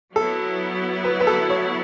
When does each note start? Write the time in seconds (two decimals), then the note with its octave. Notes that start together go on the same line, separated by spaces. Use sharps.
0.15 F#3 B3 E4 A4
1.04 B4
1.20 B4
1.27 A4
1.50 C#5